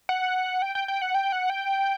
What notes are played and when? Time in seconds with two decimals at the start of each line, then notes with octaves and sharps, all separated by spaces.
0.09 F#5
0.62 G5
0.75 G5
0.88 G5
1.02 F#5
1.15 G5
1.32 F#5
1.50 G5